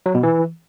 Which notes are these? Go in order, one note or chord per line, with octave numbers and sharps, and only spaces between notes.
F#3
B2
E3